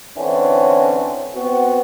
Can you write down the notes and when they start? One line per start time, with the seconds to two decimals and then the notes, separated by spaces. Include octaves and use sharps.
0.17 D3 E3 C4 C#4
1.35 B3 C4 F#4